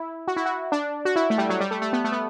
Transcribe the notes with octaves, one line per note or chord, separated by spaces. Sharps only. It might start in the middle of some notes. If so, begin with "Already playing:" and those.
Already playing: E4
F#4
E4
F#4
D4
F#4
E4
A3
G3
F#3
G3
A3
A3
B3
A3
B3